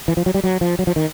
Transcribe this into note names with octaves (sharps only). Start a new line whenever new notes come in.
E3
F3
F#3
G3
F#3
F3
F#3
F3
D#3